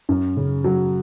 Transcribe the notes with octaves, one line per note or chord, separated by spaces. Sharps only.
F#2
C#3
F#3